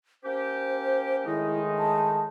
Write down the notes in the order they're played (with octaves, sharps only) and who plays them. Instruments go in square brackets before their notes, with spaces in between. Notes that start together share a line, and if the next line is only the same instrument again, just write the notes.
[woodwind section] A#3 C#4 G4 [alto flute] C5
[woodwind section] A2 D#3 D#4 [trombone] G#3 [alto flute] E4
[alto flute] A5